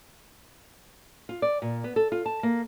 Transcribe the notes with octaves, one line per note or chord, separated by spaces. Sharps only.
F4
D5
A#2
B3
A4
F4
A5
A#3